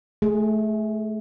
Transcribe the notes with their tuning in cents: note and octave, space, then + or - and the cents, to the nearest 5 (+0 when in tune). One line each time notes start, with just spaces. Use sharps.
A3 -25 G#4 +0